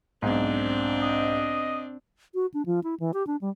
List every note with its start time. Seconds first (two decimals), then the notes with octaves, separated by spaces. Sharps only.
0.22 B1 G#2 C4 D4
1.01 D#5
2.34 F#4
2.54 D4
2.66 F3
2.84 E4
3.00 E3
3.14 G4
3.27 D4
3.41 G3